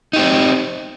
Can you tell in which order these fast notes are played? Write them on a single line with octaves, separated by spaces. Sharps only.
D#4 G4 C4